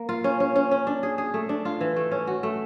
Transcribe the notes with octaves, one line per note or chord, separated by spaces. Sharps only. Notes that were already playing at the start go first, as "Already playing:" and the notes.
Already playing: A#3
F4
C#4
C#4
C#4
C#4
D4
G#4
G#4
A3
D4
F4
E3
A3
C#4
F#4
A3